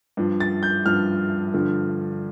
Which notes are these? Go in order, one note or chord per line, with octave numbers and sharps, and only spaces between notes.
G2 F3
A6
G6
G2 F3 F6
G2 D3 F3